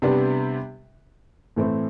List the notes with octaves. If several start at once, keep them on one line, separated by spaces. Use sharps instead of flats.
C3 G3 B3 D4 G4
A2 E3 A3 C4